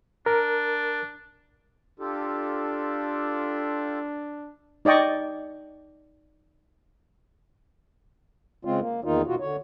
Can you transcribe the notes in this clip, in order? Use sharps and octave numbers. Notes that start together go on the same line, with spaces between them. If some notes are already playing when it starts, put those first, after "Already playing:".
D4 A#4
D4 F4 G4 A4
D#4 D5 D#5 G5 C#6
C#3 G#3 C4 F4
A#3
E2 D#3 A#3 D#4 F4
B2 F4 F#4
D3 C#5